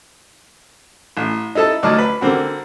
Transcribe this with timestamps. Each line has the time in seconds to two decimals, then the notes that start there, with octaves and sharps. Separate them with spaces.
1.17 A1
1.55 D#4 E4 A4 A5
1.83 D2 F#3 D#4 D5 A5 F6
1.98 B4
2.21 D3 A#3 C4 F#4